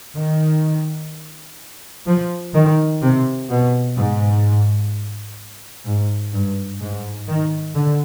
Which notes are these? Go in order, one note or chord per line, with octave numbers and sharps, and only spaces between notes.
D#3
F3
D#3
C3
B2
G#2
G#2
G2
G#2
D#3
D3